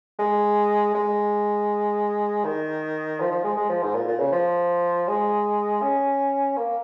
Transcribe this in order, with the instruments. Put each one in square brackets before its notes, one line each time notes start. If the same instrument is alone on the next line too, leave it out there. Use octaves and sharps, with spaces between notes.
[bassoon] G#3
G#3
D#3
F3
F3
G#3
G#3
F3
G#2
A#2
A#2
C#3
F3
G#3
C#4
A#3